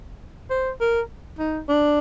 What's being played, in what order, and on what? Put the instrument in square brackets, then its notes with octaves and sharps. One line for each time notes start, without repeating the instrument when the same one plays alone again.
[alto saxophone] C5
A#4
D#4
D4